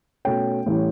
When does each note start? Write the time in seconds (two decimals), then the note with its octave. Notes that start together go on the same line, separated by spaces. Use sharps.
0.25 B2 A3 C#4 G5
0.66 A2 E3 G3 C#4